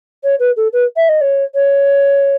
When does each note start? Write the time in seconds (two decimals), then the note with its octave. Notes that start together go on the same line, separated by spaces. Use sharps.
0.24 C#5
0.39 B4
0.56 A4
0.73 B4
0.96 E5
1.09 D#5
1.21 C#5
1.54 C#5